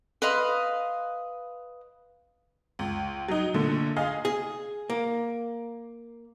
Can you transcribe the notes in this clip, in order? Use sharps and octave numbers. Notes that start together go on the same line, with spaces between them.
B4 D#5 F5 C6
C#2
F#3 D#4
A#2 D3 A3
G#4 D#5 F5
G#4
A#3